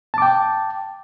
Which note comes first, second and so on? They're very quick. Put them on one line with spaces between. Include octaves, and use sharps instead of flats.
A5 D6 G5